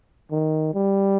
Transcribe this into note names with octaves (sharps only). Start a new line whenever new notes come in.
D#3
G3